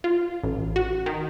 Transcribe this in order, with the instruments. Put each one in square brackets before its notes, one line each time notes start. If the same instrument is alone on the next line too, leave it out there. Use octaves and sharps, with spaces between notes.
[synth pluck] F4
A1
F#4
D#3